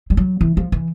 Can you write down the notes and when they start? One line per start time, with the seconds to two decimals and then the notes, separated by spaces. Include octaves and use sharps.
0.10 G3
0.17 F#3
0.41 E3
0.57 F3
0.72 E3